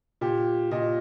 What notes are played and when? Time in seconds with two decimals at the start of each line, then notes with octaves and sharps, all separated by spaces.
0.21 A#2 G4
0.71 A#2 D#5